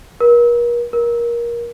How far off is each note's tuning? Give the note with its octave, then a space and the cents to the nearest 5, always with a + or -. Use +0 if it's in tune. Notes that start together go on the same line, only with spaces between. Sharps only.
A#4 +40
A#4 +20